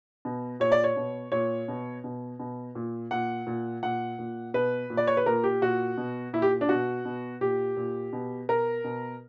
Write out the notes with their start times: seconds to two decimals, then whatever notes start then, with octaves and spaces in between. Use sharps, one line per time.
0.25 B2
0.60 A#2 C#5
0.72 D5
0.84 C#5
0.96 B2
1.32 A#2 C#5
1.68 B2
2.04 B2
2.40 B2
2.75 A#2
3.11 A#2 F#5
3.47 A#2
3.83 A#2 F#5
4.19 A#2
4.54 B2 B4
4.90 A#2
4.97 D5
5.07 C#5
5.17 B4
5.26 A#2 A#4
5.44 G4
5.62 A#2 F#4
5.97 B2
6.33 A#2 E4
6.42 G4
6.61 D4
6.69 B2 F#4
7.05 B2
7.41 A#2 G4
7.77 A#2
8.13 B2
8.49 B2 A#4
8.84 B2